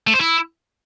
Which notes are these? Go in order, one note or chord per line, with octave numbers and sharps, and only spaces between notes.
A3
C5
E4